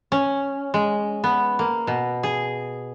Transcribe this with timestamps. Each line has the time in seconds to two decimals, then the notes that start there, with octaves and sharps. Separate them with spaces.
0.12 C#4
0.74 G#3
1.24 B3
1.59 A#3
1.87 B2
2.23 G#4